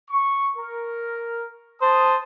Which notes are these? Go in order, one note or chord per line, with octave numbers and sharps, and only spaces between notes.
C#6
A#4
C5 A5 D#6